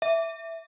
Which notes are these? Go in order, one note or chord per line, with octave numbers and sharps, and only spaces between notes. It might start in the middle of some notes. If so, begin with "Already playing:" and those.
E5